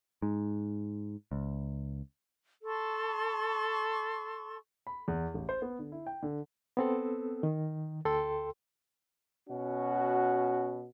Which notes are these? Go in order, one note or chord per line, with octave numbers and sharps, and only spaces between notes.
G#2
C#2
A4 A5 C6 C#6
B5
E2
A1
C5
B3
D3
E4
G5
D3
B3 C4 A4
D#3
D2 A4 G5 C6
B2 C#4 F#4